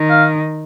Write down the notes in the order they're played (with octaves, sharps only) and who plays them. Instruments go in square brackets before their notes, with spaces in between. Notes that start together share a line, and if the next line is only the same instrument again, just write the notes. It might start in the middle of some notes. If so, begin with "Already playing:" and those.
Already playing: [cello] D#3
[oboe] F5